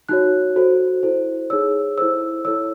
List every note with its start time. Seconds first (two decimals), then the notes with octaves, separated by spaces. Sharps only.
0.09 D#4 F#4 C#5 F#6
0.56 F#4 A4 C5
1.03 E4 A4 C5
1.50 D#4 G#4 C#5 E6
1.98 E4 A4 C5 E6
2.45 E4 A4 C#5 E6